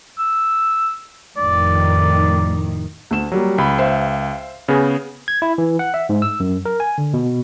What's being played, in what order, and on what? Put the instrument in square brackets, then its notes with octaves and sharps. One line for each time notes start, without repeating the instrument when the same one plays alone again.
[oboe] E6
[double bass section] F1 F2 [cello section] A2 D#3 [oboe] D5
[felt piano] D2 E7
[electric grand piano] F#3 [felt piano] G3 A#3
[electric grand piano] C#2 [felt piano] B5
[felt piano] C5 E5 F5
[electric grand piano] C#3 B3 G#4
[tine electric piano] G#6
E4
E3
F#5
E5
G#2
E6
F#2
A#4
G#5
D3
B2